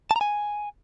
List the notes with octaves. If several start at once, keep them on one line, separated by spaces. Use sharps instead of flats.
A5
A#5
G#5